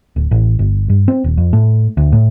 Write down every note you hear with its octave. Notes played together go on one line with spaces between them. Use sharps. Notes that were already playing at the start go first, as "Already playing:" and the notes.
D1
A1
G1
G2
C4
D#1
F2
A2
D2
A2